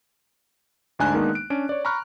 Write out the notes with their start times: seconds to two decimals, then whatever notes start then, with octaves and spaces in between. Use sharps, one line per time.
0.99 D2 G#2 D4 G#5 A#5 F#6
1.14 D#3 G#3 A#3 B3 D4 D#4
1.35 D7
1.50 C#4 D4 D7
1.69 C#5 D5
1.85 A#5 B5 C#6 F6 F#6